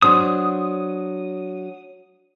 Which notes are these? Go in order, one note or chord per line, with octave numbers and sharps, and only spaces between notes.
F#3 D4 C5 D#6